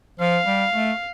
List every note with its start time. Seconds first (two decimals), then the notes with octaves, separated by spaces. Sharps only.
0.20 F3 F5
0.46 G3
0.73 A3